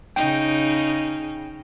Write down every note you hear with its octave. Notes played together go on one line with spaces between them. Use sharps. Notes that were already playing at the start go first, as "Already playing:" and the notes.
C#3 D#4 G5